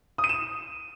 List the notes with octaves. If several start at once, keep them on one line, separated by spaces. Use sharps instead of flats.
D#6
D#7
E7